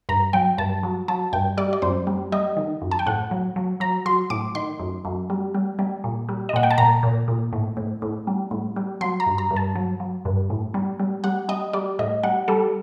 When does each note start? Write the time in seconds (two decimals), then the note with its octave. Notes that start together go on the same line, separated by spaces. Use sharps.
0.09 G2 A#5
0.33 F#3 G5
0.58 G2 A5
0.83 F#3
1.08 F#3 A5
1.33 G2 G5
1.57 G3 D5
1.73 D5
1.82 F#2 C5
2.07 G3
2.32 G3 D#5
2.57 D#3
2.82 F#2
2.91 A5
2.99 G5
3.06 A2 F#5
3.31 F#3
3.56 F#3
3.80 F#3 A#5
4.06 F#3 C6
4.30 A2 D6
4.55 D#3 C6
4.80 F#2
5.05 F#2
5.30 G3
5.54 G3
5.79 G3
6.04 A#2
6.29 G3
6.49 D#5
6.53 A#2 F#5
6.63 G5
6.71 A5
6.78 A#2 A#5
7.03 A#2
7.28 A#2
7.53 A2
7.77 A2
8.02 A2
8.27 G3
8.51 A2
8.76 G3
9.01 F#3 C6
9.20 A#5
9.26 G2
9.38 A#5
9.51 G2
9.56 A5
9.76 F#3
10.00 F#3
10.25 G2
10.50 A2
10.74 G3
11.00 G3
11.24 G3 F#5
11.49 G3 D#5
11.73 G3 D5
11.99 A2 D#5
12.23 G3 F#5
12.48 G3 A4